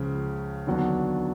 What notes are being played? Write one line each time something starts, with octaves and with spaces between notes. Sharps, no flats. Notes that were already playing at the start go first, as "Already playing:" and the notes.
Already playing: C#2 C#3 F3
D#2 D3 F#3 B3 D4